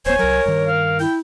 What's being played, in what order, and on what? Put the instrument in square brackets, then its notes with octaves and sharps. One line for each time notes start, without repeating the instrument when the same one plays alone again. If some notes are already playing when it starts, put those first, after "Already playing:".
[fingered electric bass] D1 B3 [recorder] C5 [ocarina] C#5 [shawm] G#5
[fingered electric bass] C2 F#3 [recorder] A#4
[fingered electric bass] G2 D#3
[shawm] F5
[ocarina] E4 [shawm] G5